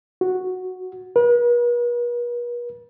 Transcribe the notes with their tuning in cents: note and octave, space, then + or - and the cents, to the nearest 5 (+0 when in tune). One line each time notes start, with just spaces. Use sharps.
F#4 -5
B4 -45